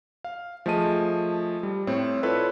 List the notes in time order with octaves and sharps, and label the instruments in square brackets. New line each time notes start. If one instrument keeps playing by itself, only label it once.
[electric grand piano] F5
F3 A3 G#4 D#5 A5 D#7
G3
A2 C4 C#5
E4 F4 A4 B4 C#5 D5